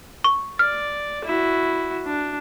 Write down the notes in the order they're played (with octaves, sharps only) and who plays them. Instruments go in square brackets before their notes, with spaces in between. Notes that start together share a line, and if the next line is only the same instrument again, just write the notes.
[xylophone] C#6
[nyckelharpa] D5 [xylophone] F6
[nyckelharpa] E4 F#4
D4